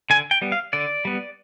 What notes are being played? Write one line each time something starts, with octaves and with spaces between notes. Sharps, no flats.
D3 G#5
G5
G3 B3
F5
D3 D5
G3 B3